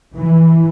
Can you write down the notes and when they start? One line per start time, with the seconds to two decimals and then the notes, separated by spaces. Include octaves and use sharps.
0.14 E3